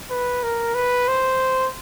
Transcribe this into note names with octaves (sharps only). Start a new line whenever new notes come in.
B4
A#4
B4
C5